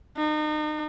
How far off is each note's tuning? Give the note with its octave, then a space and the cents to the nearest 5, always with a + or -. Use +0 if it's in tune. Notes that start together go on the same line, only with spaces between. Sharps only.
D#4 -35